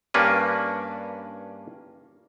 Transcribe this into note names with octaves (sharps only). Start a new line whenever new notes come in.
G2 A#3 C#4 D4 B4